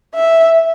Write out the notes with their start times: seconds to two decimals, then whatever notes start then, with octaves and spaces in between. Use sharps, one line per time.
0.15 E5